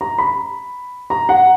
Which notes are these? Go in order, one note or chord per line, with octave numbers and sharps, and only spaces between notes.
A#5
B5
A#5
F#5